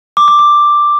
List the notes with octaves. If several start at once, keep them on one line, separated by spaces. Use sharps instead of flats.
D6
D6
D6